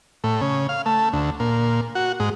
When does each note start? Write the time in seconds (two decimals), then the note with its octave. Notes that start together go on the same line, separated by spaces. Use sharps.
0.24 A2
0.41 C#3
0.69 F5
0.86 A3
1.13 D2
1.40 A#2
1.95 F#4
2.20 G#2